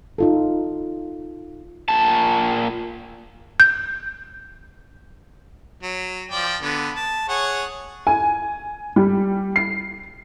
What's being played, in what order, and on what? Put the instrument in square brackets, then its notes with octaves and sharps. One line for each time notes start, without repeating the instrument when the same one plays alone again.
[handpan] D#4 F4 A4
[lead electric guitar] A#2 A5
[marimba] G6
[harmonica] F#3
F3 D5 G5
D3 B3
A5
G#4 C#5 F#5
[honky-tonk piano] G#5
G3
C7